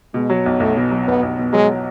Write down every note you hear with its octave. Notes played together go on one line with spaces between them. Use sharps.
B2 G#3
F#3
B1
B1 A3
B2
F#3
B1 B3
B1
B2
F#3 G#3